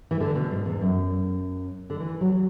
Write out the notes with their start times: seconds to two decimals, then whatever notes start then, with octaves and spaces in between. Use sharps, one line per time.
0.11 E3
0.20 D3
0.35 B2
0.51 G#2
0.66 E2
0.81 F#2
1.90 D3
2.00 E3
2.21 F#3
2.32 F#3